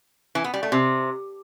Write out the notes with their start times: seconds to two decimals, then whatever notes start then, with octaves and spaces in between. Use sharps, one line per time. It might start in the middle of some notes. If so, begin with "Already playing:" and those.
0.35 E3
0.44 B3
0.54 G3
0.63 A3
0.72 C3